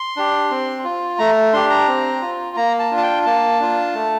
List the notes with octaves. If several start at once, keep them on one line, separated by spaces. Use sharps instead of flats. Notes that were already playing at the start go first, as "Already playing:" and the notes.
Already playing: C6
D4 G4
C4
F4
A3 A#5
D4 G4 C6
A#5
C4
F4
A#3 A#5
A5
D4 F4
A5
G5
A#3 A5
D4 F4
A3